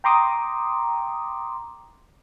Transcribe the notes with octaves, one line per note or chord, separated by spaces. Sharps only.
G5 A#5 C6 D6 D#6